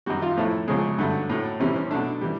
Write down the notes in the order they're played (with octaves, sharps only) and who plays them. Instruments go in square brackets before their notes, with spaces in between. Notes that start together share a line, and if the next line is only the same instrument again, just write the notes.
[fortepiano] F#2 D#3 G3 F#4
F4
A2 F3 A3 E4
F#2 C#3 F3 G#3
G2 D3 F#3 A3
A2 F#3 A3
C3 E3 G3 C#4
C#4
B2 F#3 A3 D4
E3 G3